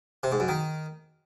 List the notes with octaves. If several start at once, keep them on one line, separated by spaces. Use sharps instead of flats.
C3
G#2
F#2
D#3